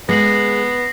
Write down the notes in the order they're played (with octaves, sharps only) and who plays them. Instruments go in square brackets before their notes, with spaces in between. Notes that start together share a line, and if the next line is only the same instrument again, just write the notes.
[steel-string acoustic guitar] G#3 [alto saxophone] B3 [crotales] A#6 C7 F#7